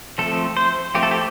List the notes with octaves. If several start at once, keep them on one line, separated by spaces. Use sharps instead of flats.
F3 A3 C4 A4
C5
F3 A3 C4 G4
A4
G4